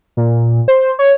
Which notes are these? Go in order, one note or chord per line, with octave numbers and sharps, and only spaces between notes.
A#2
C5
C#5